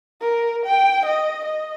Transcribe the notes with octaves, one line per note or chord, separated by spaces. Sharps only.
A#4
G5
D#5
D#5